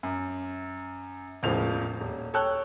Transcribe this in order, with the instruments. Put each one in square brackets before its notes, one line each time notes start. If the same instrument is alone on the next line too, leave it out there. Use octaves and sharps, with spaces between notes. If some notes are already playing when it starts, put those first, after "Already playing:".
[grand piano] F#2
E1 C#2 A2 F3 F7
D#1
A4 C#5 G5 A5 E6 F#6